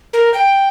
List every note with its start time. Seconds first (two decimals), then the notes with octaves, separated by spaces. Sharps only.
0.13 A#4
0.34 G5